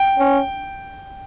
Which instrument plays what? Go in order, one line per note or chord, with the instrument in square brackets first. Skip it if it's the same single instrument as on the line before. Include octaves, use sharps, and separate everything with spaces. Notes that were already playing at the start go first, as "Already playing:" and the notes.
Already playing: [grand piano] G5
[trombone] C#4